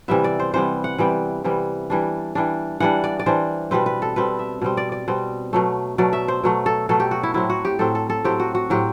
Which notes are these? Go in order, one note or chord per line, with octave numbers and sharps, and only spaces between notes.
C3 E3 G3 B3 E5
D5
C5
C3 E3 G3 B3 C5
F#5
C3 E3 G3 B3 G5
C3 E3 G3 B3
E3 G3 D4
E3 G3 D4
E3 G3 D4 F#5
D5
D5
E3 G3 D4 C5
B2 G3 C4 B4
B4
A4
B2 G3 C4 B4
E5
B2 G3 C4
D5
D5
B2 G3 C4
B2 F#3 A3
B2 F#3 A3 D5
E5
C5
B2 F#3 A3
A4
B2 F#3 A3 A4
G4
F#4
E4
A2 F#3 C4 E4
F#4
G4
A2 F#3 C4 A4
A4
A4
A2 F#3 C4 G4
F#4
F#4
A2 F#3 C4 G4